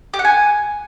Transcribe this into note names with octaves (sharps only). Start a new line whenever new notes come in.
G4
F#5
G#5